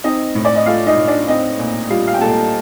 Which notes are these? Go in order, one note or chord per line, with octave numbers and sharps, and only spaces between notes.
C4 D#4 D#5
A2
D5
D#5
A3 F4 F5
D#4 D#5
A2
D4 D5
C4 D#4 D#5
A#2
G3 F4 F5
F5
G5
A#2 A4 A5